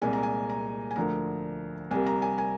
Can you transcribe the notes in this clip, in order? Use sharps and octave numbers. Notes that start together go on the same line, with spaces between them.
C2 A#2 G#3 G#5
A#5
G#5
A#5
G#5
D2 D3 F3 A#3 A#5
C2 C3 G3 A#3 G#5
A#5
G#5
G#5